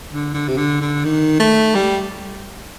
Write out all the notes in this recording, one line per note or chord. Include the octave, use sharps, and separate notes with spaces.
D3
D3
C3
D3
D3
D#3
A3
G3